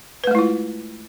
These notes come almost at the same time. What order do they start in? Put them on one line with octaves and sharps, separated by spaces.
B4 A3 G#3 E4 F4